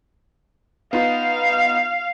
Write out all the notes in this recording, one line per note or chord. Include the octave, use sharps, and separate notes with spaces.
B3 D#4 F4 F5